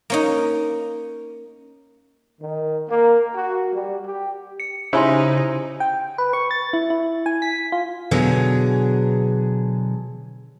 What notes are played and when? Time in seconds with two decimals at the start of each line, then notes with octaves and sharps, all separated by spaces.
0.10 A#3 C#4 D#4
2.41 D#3
2.89 A#3
3.35 F#4
3.74 G3
4.06 G4
4.60 C#7
4.93 C#3 D#4 E4 G4 C5 G#5 C6
5.80 G5
6.18 B4
6.33 C#6
6.51 A6
6.73 E4
6.90 E4
7.26 G#5
7.42 B6
7.72 F4
8.11 B2 D3 F#3 G#4